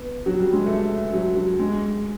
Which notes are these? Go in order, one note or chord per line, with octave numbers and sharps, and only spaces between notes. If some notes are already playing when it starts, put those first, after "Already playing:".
Already playing: B3
F#3
G3
G#3
A3
F#3
F#3
G#3